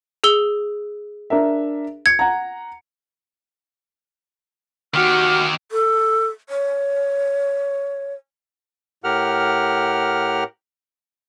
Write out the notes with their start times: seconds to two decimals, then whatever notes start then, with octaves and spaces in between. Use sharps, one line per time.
0.24 G#4 E6 G7
1.30 D4 A#4 E5
2.06 G#6 C#7
2.19 F#5 A#5
4.94 D#3 F#4 G4 F6
5.72 A4
6.49 C#5
9.04 A2 G4 A#4 F#5 F6